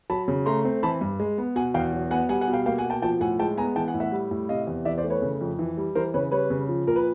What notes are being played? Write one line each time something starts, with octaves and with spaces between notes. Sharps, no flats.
F#3 A5 B5
C#3
A3 A#5 C6
C4
E3 A5 B5
G2
G#3
B3
B2 F#5 G#5
E2 F5 G5
F#3
B3 F#5 G#5
G3 F#5 G#5
F#5 G#5
B2
F5 G5
A#3 F5 G5
F#5 G#5
B2
G5 A5
F3 G5 A5
A2 F#5 G#5
G#3 G5 A5
B3 G#5 A#5
E3 G5 A5
F#5 G#5
A2
E5 F#5
G3
A2
C3 D#5 F5
E2
E3 D5 E5
C5 D5
A3
B4 C#5
C#3
F2
E3
G3
E3 A#4 C5
C#3 B4 C#5
G3 B4 C#5
C#3
F3
A#2 A#4
B4